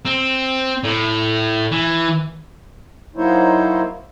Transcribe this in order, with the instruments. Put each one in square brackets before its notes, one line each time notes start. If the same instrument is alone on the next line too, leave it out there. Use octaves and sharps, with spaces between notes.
[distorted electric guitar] C4
A2
E3
[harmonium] F#3 A#3 D#4 E4 C5 C#5